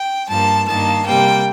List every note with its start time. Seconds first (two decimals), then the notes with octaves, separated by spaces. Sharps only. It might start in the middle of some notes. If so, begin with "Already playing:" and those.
Already playing: G5
0.28 G2 F3 A#3 A5
0.67 G2 D#3 A#3 A5
1.06 C3 G3 A#3 G5